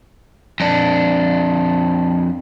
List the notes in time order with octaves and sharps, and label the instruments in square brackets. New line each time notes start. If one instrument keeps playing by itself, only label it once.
[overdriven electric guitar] F2 D4